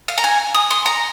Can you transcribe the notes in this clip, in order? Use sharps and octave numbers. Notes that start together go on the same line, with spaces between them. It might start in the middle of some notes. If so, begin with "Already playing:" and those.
F5
A#5
G#5
D#6
C6
A#5